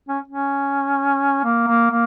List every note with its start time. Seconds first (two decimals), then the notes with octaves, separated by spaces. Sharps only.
0.08 C#4
0.28 C#4
1.44 A#3
1.67 A#3
1.90 A#3